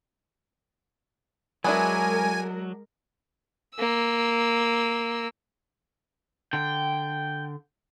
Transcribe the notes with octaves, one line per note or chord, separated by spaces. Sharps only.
F#3 G#3 B3 D4 E4 A#4 G#5
A#3 E6
D3 G5